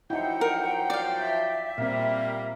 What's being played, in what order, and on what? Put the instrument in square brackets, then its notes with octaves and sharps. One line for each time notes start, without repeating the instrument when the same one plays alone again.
[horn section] F3 F#3 G5 [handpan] D#4 E4 [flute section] F#5
[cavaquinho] A#4
D5 F5
[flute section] E5
[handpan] A#2 C4 [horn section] G3 A#3